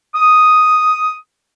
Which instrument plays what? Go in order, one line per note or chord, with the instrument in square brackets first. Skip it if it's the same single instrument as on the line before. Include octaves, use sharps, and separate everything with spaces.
[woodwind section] D#6